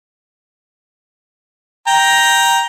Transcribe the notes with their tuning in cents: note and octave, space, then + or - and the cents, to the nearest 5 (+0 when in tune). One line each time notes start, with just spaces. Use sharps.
G5 +0 A#5 +10